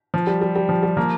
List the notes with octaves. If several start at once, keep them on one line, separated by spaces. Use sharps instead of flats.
F3
G3
G3
G3
F3
G3
F3 A#3